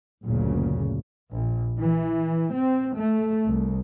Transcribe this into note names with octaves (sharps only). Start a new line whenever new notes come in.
F#1 D2 A#2 C#3
A#1
E3
C4
A3
C2